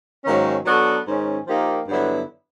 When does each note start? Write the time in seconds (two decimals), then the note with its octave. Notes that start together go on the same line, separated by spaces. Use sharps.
0.24 G#2 D#3 F#3 A#3 C#4
0.65 F#3 B3 D4 F#4 A4
1.07 G#2 D#3 G#3 C#4
1.47 F3 A#3 D#4 G4 A#4
1.88 G2 D3 F#3 B3 E4